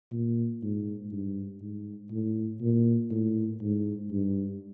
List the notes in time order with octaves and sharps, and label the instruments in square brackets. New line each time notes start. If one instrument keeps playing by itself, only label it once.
[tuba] A#2
G#2
G2
G#2
A2
A#2
A2
G#2
G2